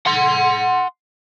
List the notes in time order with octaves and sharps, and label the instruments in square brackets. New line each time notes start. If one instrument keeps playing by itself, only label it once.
[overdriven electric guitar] F#5 C6